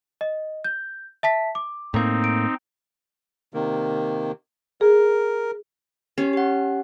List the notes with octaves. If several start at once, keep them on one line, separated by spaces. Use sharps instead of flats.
D#5
G6
E5 A5 B6
D6
A2 A#3 C4 D#4
D7
C3 D#3 A#3
G#4 A#4
C#4 G4
G4 F#5